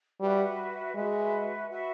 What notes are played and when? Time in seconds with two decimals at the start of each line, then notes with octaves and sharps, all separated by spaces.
0.20 G3 F#4 B4 E5
0.95 G#3 F#4 B4 E5
1.69 F#4 B4 E5